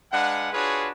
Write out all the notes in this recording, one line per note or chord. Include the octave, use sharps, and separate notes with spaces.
G#3 D4 B4 F5 F#5
D4 F4 F#4 G#4 B4 C#5